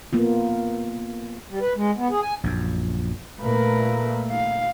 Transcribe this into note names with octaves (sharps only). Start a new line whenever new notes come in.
A#3 B3 F4
G3
B4
G#3
B3
G#4
G#5
A#1 F#2
A#2 A3 A#3 A#4 B4
F5